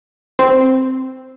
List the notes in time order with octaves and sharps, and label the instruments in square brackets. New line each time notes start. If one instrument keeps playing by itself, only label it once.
[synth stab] C4